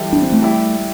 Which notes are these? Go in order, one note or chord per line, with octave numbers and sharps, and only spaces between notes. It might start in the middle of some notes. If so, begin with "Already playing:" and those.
Already playing: E3 G3 E4 A4
D4
C4
A3
G3 E4 G4